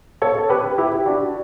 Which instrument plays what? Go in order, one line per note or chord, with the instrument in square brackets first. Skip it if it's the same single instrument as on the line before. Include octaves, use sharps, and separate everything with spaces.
[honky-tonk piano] A4 C#5
G4 B4
E4 G4
D4 F#4